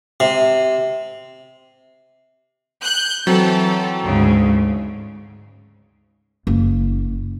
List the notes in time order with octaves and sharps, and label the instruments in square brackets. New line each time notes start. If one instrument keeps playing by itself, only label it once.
[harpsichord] C3
[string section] F#6 G6
[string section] E3 A4 [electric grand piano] F#3 C4
[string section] D2 G#2 C#3
[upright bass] F#1